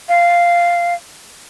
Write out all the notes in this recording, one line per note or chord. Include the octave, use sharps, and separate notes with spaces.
F5